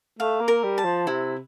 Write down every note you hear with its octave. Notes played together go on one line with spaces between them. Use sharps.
A3 F5
A#3
A#4
G3
A5
F3
C3 E4